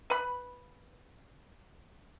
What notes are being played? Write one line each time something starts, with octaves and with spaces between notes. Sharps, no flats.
B4 B5